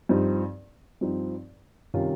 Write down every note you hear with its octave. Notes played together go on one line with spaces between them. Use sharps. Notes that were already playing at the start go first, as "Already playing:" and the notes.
G2 F3 C4 D#4
G2 F3 C4 D#4
C3 D#3 G3 C#4 F4